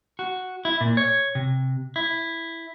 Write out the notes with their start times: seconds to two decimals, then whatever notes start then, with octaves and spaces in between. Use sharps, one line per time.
0.19 F#4
0.65 E4
0.81 A#2
0.97 C#5
1.35 C3
1.96 E4